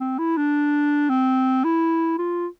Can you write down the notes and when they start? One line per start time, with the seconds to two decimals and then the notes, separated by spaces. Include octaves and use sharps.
0.01 C4
0.19 E4
0.37 D4
1.10 C4
1.64 E4
2.18 F4